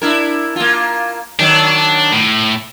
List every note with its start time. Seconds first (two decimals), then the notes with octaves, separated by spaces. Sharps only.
0.02 D4 E4 A#4
0.56 A#3 F4
1.39 D#3 F#3 D4
2.12 A2